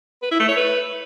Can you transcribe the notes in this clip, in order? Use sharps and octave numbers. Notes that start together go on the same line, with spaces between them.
B4
E4
A3
C#5
B4